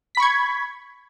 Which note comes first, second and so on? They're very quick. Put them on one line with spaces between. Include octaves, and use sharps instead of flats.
B6 B5 C#6 G#6